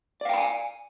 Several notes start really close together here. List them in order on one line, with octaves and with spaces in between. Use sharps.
D5 F5 G5 B5 G#5